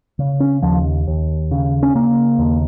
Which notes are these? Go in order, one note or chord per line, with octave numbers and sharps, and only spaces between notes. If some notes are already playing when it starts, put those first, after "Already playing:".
C#3
C#4
D#2 F3
D#2
C#3
C#4
C#3 A#3
D#2